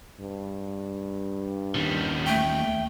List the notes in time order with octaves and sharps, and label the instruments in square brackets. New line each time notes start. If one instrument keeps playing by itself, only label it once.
[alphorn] G2
[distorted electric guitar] D#2 C#4 [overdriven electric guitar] D#3 G3
[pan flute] A3 [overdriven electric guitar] G5